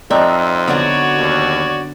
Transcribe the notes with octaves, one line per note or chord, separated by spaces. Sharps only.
F2 C4 D4 D#4 E5
D3 F#3 B3 F#4 C#5 D5
D#2